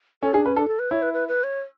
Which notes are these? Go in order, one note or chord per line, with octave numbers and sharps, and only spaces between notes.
C#4 A4
D4 G#4
C#4 B4
D4 A4
A4
B4
E4 C#5
B4
B4
B4
C#5